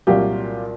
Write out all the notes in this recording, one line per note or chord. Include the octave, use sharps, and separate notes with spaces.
C2 A#2 F#3 F4 G4